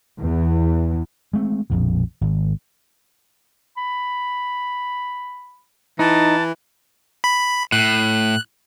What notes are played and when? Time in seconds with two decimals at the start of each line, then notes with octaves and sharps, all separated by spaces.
0.18 E2 E3
1.33 G#3 A3 C4
1.70 A#1 F2 B2
2.21 G#1
3.77 B5
5.99 E3 D#4 A5
7.24 B5
7.72 A2 F#6